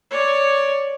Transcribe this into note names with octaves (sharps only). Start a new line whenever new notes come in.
C#5 D5